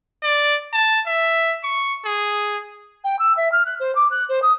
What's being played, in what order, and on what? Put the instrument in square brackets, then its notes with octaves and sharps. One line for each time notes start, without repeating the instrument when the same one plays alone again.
[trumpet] D5
A5
E5
C#6
G#4
[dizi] G5
E6
E5
F6
F#6
C5
D6
F#6
C5
D#6